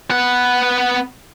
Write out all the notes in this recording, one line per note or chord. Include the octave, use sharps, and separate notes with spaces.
B3 F#5